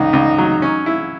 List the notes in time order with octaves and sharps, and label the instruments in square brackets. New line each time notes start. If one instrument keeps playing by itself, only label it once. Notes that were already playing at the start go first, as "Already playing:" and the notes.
Already playing: [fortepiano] C#2 [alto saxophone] D#4
[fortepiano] C#2
F#3
C#4
E4